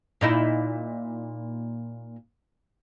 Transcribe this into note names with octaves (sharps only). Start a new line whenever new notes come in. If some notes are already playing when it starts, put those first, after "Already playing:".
A#2 D#4 E4